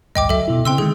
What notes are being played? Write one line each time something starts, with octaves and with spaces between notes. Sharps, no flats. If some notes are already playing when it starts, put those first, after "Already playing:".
A1 D2 G2 D#5 G5 D6
C#2 F#2 F#3 A4 E5
B2 E4
C#3 C4 G5 C6 E6
D3 D#3 G#3 G#4